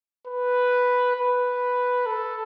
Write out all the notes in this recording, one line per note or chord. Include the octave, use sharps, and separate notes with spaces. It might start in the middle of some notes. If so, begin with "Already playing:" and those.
B4
B4
A4